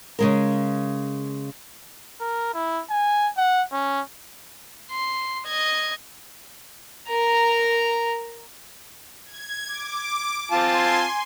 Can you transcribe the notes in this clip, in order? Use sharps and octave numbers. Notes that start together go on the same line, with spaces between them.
C#3 G#3 A#4
A#4
E4
G#5
F#5
C#4
C6
D#5 G#6
A#4 A#5
G#6
D6
C4 F4 G#5 A5 C6